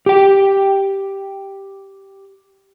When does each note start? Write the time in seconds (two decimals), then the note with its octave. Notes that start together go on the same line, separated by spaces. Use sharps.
0.06 G4 G5